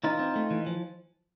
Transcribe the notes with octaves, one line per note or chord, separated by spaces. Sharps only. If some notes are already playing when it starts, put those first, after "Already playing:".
E3 D#4 F4
C4
A3
E3
F3